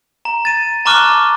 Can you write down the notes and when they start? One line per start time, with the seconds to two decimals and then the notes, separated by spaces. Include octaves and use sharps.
0.25 A#5
0.45 A6 D#7
0.85 A5 A#5 C#6 D6 F6 F#6